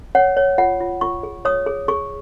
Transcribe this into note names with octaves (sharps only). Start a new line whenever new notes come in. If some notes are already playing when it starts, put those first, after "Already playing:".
C#5 F#5
C#5
F4 F#5
F4
F4 C#6
G#4
C#5 D#6
G#4
G#4 C#6